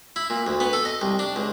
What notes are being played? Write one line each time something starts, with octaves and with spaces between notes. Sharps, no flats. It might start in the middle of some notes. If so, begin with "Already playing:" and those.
E4
A#2
D2
B3
A4
D#5
C2
D4
C#2